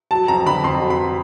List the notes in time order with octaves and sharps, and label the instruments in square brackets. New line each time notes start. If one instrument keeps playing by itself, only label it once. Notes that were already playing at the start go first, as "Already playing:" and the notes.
[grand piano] F#3 A5
F2 A#5
D3 B5
F2 C6
F#3
B5